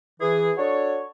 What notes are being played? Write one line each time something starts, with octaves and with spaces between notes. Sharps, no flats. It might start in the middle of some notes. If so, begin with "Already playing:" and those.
E3 G#4
D4 F#4 A4 C#5